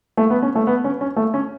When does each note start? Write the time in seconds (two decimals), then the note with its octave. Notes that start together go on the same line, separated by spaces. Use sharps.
0.17 A3
0.30 B3
0.43 C#4
0.55 A3
0.67 B3
0.84 C#4
1.01 C#4
1.16 A3
1.34 C#4